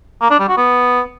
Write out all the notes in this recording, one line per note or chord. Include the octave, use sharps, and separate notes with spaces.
A#3
D4
G3
F#4
B3